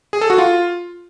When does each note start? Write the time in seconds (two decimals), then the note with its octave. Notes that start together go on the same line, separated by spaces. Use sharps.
0.13 G#4
0.21 A4
0.30 F#4
0.38 F4